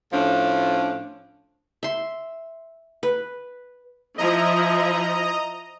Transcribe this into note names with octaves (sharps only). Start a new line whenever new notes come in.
A2 F3 C#4 D4
E5 C6
B4
F3 E4 D#5 A#5 D#6